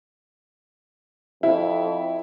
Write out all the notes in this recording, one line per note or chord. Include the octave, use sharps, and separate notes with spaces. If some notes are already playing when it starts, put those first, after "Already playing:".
F2 E4